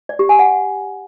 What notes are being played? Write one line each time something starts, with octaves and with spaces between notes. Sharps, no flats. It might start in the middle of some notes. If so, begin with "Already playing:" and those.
D5
G4
G#5
F#5